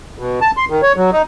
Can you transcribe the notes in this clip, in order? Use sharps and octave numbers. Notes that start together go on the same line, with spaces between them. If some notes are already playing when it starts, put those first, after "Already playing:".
B2
A5
C6
D#3
C#5
F#3
D#4